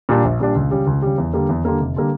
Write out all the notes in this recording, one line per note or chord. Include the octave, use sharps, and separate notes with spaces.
A#2 G3 D4
A#1
A#2 G3 D4
C#2
C#3 G3
C#2
C#3 G3
E2
D3 G3 A#3
E2
D3 G3 A#3
F1
D3 G3 A#3